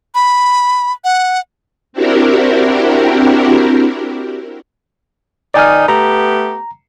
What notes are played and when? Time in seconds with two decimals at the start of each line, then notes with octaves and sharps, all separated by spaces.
0.15 B5
1.04 F#5
1.93 C4 D4 E4 F#4 G4 A#4
5.54 D#3 D#4 D5 G#5 F6
5.88 A3 B3 G4 A#5